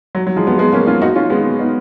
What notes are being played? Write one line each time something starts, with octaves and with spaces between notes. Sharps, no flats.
F#3
F#3
F3 G#3
G#3 B3
G#3 B3
A#3 C#4
C#4 F4
D#4 F#4
C#4 F4
G#3 B3
B3 D#4